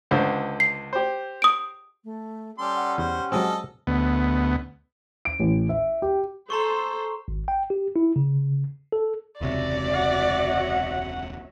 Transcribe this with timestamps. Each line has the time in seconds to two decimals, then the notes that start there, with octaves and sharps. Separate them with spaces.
0.11 C#2 D3 C5
0.60 C7
0.93 G4 C5
1.42 D#6 D7
2.04 A3
2.58 G3 C#4 G4 A4 C6
2.76 F#5
2.98 E2 C5
3.32 F#3 G#3 C4 A4 D#5
3.87 D2 B3
5.25 D7
5.40 A1
5.69 E5
6.02 G4
6.50 A4 C5 A#5 C6 C#6
7.28 G#1
7.48 G5
7.70 G4
7.96 E4
8.16 C#3
8.92 A4
9.41 E1 C#2 C3 F#4 C#5 D5 E5
9.92 F#5